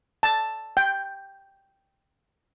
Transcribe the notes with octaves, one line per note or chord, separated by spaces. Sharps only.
A5
G5